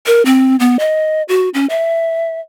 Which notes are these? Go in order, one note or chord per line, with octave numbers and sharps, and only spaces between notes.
A#4
C4
B3
D#5
F#4
C#4
E5